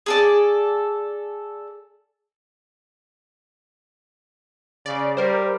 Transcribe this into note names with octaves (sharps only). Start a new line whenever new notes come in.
G#4 A4 D5
C#3 D5
G3 A#4 C5